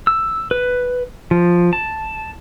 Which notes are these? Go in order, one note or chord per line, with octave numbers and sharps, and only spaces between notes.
E6
B4
F3
A5